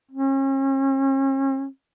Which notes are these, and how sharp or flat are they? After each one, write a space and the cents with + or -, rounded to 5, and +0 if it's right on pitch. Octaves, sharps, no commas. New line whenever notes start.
C#4 -40